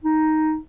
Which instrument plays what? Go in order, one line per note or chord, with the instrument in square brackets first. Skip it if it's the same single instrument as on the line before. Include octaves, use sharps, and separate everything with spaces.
[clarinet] D#4